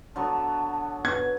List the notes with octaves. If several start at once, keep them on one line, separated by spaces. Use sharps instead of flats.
D3 F#3 B3 A5
B4 G#6